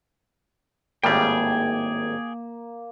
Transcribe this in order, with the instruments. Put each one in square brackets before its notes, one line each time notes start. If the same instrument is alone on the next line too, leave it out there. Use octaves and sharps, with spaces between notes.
[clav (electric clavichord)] G#1 A2 G3 [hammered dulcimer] A#3 [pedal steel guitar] G#4 G5